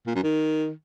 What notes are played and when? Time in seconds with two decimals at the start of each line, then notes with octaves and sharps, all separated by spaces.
0.07 A#2
0.15 F#2
0.23 D#3